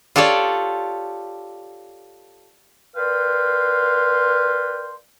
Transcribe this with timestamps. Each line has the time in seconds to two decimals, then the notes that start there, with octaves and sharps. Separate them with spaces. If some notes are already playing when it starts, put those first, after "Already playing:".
0.16 F4 G4 A4 C#5 D5
2.96 A#4 B4 D5 F5 G5 C6